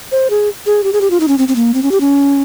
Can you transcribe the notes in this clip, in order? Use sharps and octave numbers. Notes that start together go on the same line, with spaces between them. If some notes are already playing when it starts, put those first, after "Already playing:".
C5
G#4
G#4
G4
G#4
G4
F4
D#4
C#4
C4
C4
A#3
C4
C#4
G4
C#4